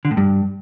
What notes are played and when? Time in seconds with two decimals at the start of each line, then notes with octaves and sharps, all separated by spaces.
0.05 D3
0.11 A2
0.17 G2